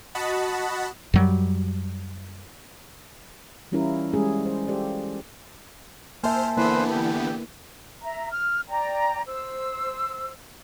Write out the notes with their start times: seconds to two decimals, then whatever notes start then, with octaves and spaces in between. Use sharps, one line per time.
0.15 F#4 D#5 F#5 A5 B5
1.14 F#2 F#3 G3
3.72 E3 G3 C#4 E4 F4 A#4
4.13 G3 G#3 C#4 G#4
4.46 C5
4.67 F4 G4 A4 C5 D5
6.23 A#3 C5 E5 G#5 A5 F6 G6
6.57 D3 E3 A#3 B3 E4 B4 C5
6.90 G4
8.02 E5 A#5
8.31 F6
8.69 D5 G5 A#5
9.27 C5 E6